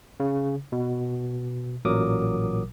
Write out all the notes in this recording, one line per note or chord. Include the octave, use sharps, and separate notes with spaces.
C#3
B2
A1 A#2 F#3 A#4 D6 D#6